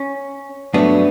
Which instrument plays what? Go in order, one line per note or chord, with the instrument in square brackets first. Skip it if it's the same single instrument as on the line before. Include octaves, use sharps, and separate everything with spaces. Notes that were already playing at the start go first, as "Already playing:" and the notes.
Already playing: [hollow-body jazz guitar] C#4
G2 F#3 A3 B3 D4